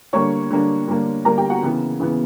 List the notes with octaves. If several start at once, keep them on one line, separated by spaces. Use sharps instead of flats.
D3 G3 A#3 D4 C#5 C#6
D3 G3 A#3 D4
D3 G3 A#3 D4
D3 G3 A#3 D4 A#4 A#5
G4 G5
F#4 F#5
C#3 E3 B3
C#3 E3 B3